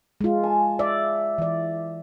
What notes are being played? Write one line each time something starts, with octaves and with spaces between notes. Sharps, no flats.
G#3 F4
G#5 A5
D5 E5
E3 D5